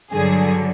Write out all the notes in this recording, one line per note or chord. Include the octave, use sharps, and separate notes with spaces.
G2 D3 F#3 G#4